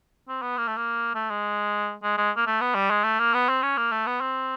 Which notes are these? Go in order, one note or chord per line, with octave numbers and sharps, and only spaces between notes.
C4
B3
A#3
A3
A#3
A3
G#3
G#3
G#3
A#3
A3
B3
G3
G#3
A3
A#3
B3
C4
C#4
A#3
A3
B3
C4